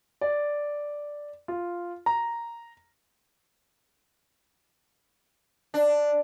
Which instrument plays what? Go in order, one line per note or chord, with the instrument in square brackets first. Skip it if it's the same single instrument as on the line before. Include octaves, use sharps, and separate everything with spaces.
[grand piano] D5
F4
A#5
[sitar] D4